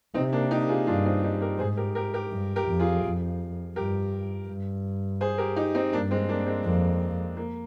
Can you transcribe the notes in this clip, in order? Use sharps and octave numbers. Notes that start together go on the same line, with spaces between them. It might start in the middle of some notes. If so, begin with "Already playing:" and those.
C3 C4 D#4
A#3 D4
D#4 G4
F4 G#4
G2 D4 F4
C4 D#4
D#4 G4
G4 A#4
G#2 G#4 C5
G4 A#4
G4 A#4
G4 A#4
G2
G4 A#4
F2
F4 G#4
F2
G2 G4 A#4
G2
G#4 C5
G4 A#4
D#4 G4
C4 D#4
G2 A#3 D4
G#3 C4
A#3 D4
G#3 C4
F2 A#3
A#3